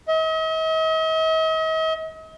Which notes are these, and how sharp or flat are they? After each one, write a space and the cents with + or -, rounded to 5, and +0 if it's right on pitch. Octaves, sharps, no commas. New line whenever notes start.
D#5 +45